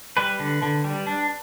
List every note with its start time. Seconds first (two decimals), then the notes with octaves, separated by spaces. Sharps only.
0.17 G3 B4
0.39 D3
0.62 D3
0.84 G3
1.07 D4